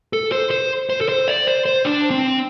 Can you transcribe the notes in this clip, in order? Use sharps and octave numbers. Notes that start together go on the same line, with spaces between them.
A4
C5
C5
C5
A4
C5
D5
C5
C5
D4
C4